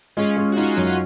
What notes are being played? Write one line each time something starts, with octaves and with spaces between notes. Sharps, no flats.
G#3 C#4 F4
G#3
F#4
C#4 D#4 F4
C#4 F4
F#2
C#4 F4